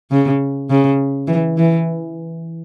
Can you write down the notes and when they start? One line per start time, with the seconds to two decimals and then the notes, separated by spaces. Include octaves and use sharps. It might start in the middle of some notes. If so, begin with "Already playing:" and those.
0.11 C#3
0.70 C#3
1.28 E3
1.57 E3